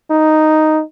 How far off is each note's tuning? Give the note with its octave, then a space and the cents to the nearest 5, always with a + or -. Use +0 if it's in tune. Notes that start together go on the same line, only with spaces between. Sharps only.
D#4 +0